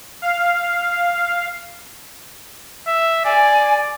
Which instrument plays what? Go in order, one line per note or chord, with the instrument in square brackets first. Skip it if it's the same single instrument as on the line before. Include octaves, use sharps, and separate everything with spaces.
[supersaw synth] F5
[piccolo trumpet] E5
[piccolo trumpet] D5 [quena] G#5